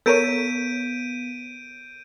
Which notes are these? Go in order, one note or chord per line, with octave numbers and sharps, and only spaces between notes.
B3 A4 A#4 C#5 G6 B6 D7 D#7